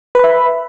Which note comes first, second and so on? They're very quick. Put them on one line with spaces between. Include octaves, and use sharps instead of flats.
B4 B5 E5